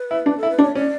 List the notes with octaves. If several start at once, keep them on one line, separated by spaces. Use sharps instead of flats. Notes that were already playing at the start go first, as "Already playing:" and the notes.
Already playing: B4
E4
D4
A4
E4
B4
D4
C#5
C#4 D5